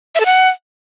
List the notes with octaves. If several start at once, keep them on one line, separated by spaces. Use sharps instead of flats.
E5
A4
F#5